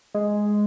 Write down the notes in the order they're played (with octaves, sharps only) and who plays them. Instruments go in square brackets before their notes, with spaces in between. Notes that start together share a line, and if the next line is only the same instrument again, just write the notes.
[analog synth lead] G#3